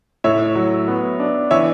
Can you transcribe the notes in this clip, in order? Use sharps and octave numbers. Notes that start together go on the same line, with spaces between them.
A2 C#5 E5
F#3
B3
D4
E3 C#5 E5